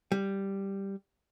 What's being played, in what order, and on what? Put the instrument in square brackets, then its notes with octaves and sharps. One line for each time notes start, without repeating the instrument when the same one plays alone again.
[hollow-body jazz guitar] G3